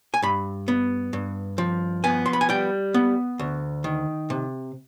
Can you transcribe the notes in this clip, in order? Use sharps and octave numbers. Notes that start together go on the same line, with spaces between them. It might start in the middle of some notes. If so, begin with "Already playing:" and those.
G#5
G2 B5
B3
G2
F3
B3 G#5
C6
B5
G#5
G3 G5
B3
D2
D#3
C3